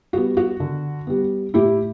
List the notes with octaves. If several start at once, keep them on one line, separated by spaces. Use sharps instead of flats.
G3 B3 F#4
F#4
D3
G3 B3
A2 E4 G4